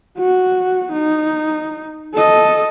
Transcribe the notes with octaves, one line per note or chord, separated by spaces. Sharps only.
F#4
D#4
A4 D#5